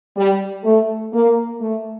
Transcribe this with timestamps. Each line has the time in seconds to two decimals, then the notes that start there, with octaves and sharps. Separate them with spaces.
0.16 G3
0.64 A3
1.13 A#3
1.60 A3